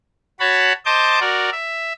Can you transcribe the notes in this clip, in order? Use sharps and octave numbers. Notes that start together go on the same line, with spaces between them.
F#4 C#5 A5 B5
C5 D#5 A5 D6 G6
F#4 A#4 D5
E5